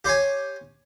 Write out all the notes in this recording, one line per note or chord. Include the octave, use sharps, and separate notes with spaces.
G4 C5 C#5 G#5